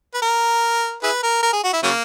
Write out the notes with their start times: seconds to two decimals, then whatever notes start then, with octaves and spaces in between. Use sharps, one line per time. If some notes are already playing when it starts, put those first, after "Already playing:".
0.14 B4
0.22 A#4
1.03 E4 G#4 B4
1.23 A#4
1.43 A#4
1.53 G#4
1.64 F#4
1.73 E4
1.83 C#3 F#3 A#3